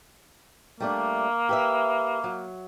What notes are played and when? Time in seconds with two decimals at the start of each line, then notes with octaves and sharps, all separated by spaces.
0.80 G3 A3 A#3 D4
1.49 G4 B4 E5
2.24 F#3